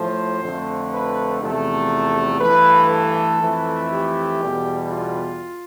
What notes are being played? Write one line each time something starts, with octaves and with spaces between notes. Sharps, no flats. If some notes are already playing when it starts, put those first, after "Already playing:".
Already playing: A2 F3 A3 C5
F2 D3 F3 A3
B4
E2 C3 F3 A3 A4
G2 E3 A3 B4
A4
F2 E3 A3
G4
E2 B2 G3
F4